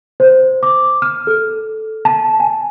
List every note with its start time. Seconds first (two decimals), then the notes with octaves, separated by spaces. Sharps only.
0.20 C5
0.63 D6
1.02 F6
1.27 A4
2.05 A5
2.40 G#5